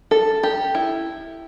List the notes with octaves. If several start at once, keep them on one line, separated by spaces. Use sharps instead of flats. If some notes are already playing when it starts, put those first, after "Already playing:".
A4
G4
E4